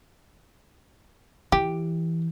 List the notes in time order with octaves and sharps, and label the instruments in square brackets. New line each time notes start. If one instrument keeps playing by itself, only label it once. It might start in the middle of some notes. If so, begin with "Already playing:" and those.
[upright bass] E3 [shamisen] G4